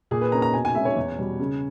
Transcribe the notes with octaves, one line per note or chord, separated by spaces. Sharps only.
A#2 G#4
B4
A#3 C#4 A#5
A#5
B2 G#5
G#5
G#3 C#4 E5
C#5
E2
B2 G3
C#3